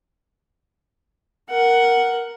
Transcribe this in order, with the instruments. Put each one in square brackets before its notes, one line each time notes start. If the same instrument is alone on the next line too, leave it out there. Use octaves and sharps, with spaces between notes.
[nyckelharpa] A#4 F#5